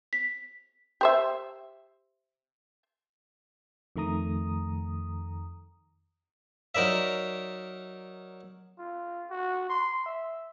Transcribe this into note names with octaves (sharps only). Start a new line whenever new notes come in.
B6
G4 C5 E5
F2 D#3 A3 A#5 D#6
F#3 D#4 A#4 D5 E5
F4
F#4
C6
E5